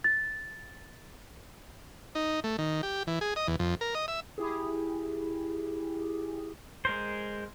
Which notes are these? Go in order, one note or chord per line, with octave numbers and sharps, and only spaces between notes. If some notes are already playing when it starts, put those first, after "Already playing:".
A6
D#4
A3
D#3
G4
E3
G#4
D#5
E2
F2
A#4
D#5
E5
E4 G4 G#4
G#3 A#4 C5